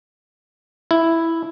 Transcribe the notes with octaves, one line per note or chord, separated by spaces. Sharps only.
E4